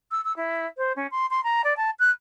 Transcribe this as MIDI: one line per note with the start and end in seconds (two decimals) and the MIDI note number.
0.11 0.21 88
0.25 0.35 88
0.37 0.66 64
0.77 0.93 72
0.96 1.07 61
1.11 1.26 84
1.30 1.41 84
1.44 1.62 82
1.64 1.74 74
1.77 1.91 81
1.99 2.11 90